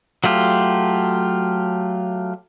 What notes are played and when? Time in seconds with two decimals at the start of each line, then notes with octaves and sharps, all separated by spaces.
0.24 F#3 A3 F4 G4